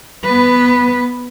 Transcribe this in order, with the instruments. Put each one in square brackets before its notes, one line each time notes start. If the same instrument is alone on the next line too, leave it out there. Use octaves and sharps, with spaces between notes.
[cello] B3 B4